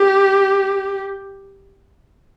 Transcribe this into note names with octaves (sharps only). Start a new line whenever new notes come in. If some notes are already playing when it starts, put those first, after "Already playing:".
Already playing: G4